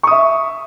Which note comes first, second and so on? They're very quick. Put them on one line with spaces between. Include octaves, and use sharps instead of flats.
C#6 D#6 E5